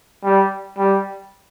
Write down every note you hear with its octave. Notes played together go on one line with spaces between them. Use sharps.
G3
G3